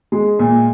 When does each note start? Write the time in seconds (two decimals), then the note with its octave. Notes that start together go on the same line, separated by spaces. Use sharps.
0.12 G#3
0.39 A#2